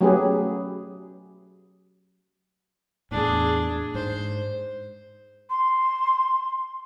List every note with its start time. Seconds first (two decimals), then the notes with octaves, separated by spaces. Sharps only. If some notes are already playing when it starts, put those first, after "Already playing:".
0.01 F#3 A3 C#4 G4 G#4 B4
3.11 E2 A2 D4 G#4
3.95 G#2 C5
5.50 C6